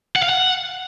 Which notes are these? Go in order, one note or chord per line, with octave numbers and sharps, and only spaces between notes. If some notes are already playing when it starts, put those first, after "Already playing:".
F#5
F5
F#5